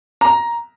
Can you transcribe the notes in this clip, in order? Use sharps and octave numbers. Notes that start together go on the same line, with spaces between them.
A#5